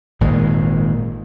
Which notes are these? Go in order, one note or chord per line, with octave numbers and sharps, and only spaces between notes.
G#1 A#2 D#3 G#3